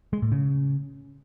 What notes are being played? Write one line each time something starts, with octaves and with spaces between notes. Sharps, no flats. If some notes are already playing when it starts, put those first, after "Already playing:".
G#3
A2
C#3